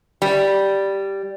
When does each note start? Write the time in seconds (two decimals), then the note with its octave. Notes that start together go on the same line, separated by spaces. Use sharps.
0.22 G3